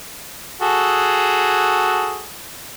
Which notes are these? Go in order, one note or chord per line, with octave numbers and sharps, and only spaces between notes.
F#4 G#4 A4